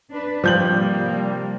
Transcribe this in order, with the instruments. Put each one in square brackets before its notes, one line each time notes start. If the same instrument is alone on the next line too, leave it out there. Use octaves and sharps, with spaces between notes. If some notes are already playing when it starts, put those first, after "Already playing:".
[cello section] D4 B4
[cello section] G#2 [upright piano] F3 G6 F#7 [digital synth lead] G3
[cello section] C3 A#3